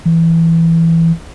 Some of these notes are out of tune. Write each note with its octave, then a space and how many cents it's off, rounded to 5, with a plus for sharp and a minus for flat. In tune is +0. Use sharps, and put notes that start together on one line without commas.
E3 +5